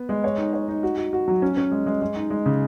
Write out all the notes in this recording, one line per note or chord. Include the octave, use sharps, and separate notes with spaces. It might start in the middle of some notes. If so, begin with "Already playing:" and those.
Already playing: B3
G#3
C#5
D#4
C#5
D#4
F#4
F#4
F#4
F#3
C#4
C#4
G#3
G#3
G#3
D#4
G#3
C#3